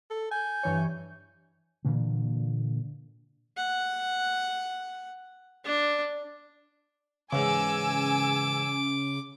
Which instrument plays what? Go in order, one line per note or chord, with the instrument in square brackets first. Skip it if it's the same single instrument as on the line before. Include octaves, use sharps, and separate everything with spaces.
[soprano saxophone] A4
[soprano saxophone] G#5 [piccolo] G6
[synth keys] G2 E3 C#5
[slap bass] A#2 D3 E3 A#3
[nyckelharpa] F#5
D4
[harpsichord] E2 G#2 [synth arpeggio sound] C#3 [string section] G#5 E6 [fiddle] D6